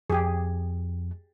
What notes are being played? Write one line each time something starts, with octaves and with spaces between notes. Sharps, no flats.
F2 G4 G#4